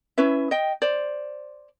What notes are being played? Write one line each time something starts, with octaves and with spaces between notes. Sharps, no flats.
C#4 E4 B4 E5
D#5 G5
C5 D5